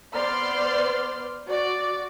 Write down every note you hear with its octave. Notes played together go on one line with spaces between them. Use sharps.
B3 C5 D5 C6 F6
F#4 D5